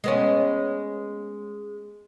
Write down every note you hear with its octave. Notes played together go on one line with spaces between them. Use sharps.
G#3 B3 C#4